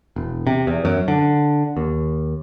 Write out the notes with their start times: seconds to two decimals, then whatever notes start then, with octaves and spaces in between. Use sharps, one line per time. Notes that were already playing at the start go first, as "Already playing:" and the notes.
0.16 E1
0.47 C3
0.67 E2
0.85 F#2
1.08 D3
1.77 D#2